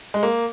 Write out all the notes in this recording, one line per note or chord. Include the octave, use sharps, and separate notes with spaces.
G#3
A#3